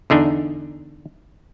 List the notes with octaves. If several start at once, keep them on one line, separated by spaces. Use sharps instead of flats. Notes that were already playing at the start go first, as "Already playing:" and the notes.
E2 D3 D4 D#4